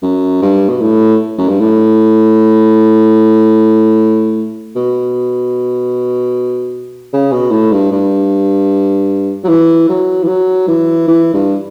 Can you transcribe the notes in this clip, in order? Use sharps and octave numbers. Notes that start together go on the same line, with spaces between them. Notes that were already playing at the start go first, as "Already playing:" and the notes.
F#2
G2
B2
A2
F#2
G2
A2
B2
C#3
B2
A2
G2
G2
F#3
E3
F#3
E3
F#3
E3
E3
G2